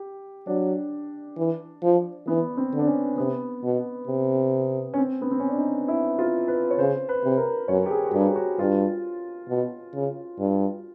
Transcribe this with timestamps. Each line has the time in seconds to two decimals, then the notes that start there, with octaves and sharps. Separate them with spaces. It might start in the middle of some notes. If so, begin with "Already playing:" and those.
Already playing: G4
0.47 F#3 D4
1.37 E3
1.83 F3
2.27 E3 B3
2.57 C4
2.73 D3
2.79 D4
2.87 C#4
3.17 C3 B3
3.63 B2
4.07 C3
4.94 C#4
4.98 C4
5.22 B3
5.31 C4
5.40 C#4
5.49 D4
5.58 D#4
5.88 E4
6.19 F4
6.48 B4
6.71 C#5
6.78 C#3 C5
7.09 B4
7.23 C3
7.38 A#4
7.68 F#2 C#5
7.86 G4
7.91 G#4
8.07 F#4
8.13 G2 G4
8.35 F#4
8.59 G2 F4
9.49 B2
9.94 C#3
10.39 G2